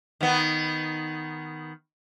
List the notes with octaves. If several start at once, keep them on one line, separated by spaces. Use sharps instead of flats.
D#3 B3